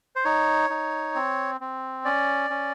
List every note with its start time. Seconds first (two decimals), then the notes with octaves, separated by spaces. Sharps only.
0.16 C5
0.25 D#4 C#5
0.70 D#4
1.15 C4
1.61 C4
2.05 C#4 D5
2.50 C#4